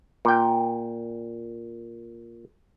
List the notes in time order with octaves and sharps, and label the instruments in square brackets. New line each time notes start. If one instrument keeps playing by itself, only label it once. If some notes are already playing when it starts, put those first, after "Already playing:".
[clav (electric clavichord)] A#2 G5